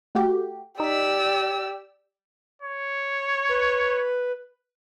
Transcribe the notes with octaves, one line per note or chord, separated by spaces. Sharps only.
A3 F#4 G4
D#4 G4 D5 E6 B6
C#5
B4